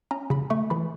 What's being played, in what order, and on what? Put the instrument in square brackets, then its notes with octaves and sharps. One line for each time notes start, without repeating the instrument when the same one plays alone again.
[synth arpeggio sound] C#4 A#5
C#3 B5
A3 C#6
E3 B5